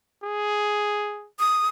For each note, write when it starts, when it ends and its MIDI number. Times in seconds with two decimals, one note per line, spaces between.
0.24 1.28 68
1.39 1.68 87